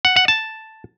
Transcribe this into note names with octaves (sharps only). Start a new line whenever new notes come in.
F#5
F#5
A5